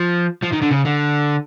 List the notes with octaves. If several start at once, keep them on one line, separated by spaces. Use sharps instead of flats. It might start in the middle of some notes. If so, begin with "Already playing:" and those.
Already playing: F3
F3
D#3
D3
C#3
D3